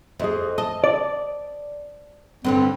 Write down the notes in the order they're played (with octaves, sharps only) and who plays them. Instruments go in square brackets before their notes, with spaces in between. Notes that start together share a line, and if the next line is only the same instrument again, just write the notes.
[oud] F2 [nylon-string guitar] G#4 D#5 E5
[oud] D#5 [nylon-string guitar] A5
[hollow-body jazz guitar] D5
[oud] G2 D3 G3 [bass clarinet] C4